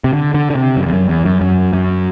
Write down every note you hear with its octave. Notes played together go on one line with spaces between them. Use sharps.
C3
D3
D3
D3
C3
F#2
E2
F#2
E2
F#2
F#2
F#2